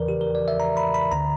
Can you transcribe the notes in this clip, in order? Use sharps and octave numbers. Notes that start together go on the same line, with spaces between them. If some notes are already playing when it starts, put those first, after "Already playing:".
Already playing: E2 C#3 E3 A#4 B4 D5
G4
A#4
D5
E5
A#5
B5
B5
D2 D3 A#5